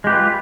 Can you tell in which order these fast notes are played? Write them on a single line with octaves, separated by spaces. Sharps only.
G#3 G4 B4 F4